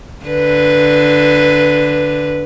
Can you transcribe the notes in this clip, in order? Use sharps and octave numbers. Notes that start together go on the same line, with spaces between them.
D3 B4